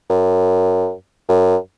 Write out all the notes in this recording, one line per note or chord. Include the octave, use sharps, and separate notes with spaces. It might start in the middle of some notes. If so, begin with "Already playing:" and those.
F#2
F#2